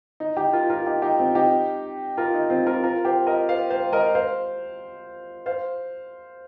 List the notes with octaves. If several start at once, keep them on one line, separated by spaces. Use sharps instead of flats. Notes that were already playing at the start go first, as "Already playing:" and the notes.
D#4
D#4 G4
F4 A#4
F4 A#4
D#4 G4
D#4 G4
C4 F4
D#4 G4
F4 A#4
D#4
C4 F4
F4 A#4
F4 A#4
G4 C5
A#4 D#5
C5 F5
C5 F5
A#4 D#5
C5 F5
C5 F5